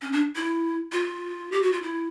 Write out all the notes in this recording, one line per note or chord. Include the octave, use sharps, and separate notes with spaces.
C#4
D4
E4
F4
G4
F#4
F4
E4